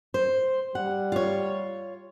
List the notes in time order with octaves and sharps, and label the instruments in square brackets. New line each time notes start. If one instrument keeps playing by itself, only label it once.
[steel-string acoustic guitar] C5
[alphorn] G3 [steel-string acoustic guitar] F#5
[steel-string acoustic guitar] F4 C#5